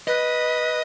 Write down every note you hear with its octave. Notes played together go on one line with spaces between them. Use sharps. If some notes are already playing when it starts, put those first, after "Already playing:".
B4 D#5